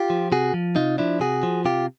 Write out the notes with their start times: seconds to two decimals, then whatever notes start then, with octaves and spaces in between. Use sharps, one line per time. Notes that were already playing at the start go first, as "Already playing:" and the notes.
Already playing: F4 G4
0.10 F3
0.32 C3 F#4 G#4
0.54 F3
0.76 C3 D#4 F4
0.98 F3 D4 E4
1.20 C3 F#4 G#4
1.43 F3
1.65 C3 F4 G4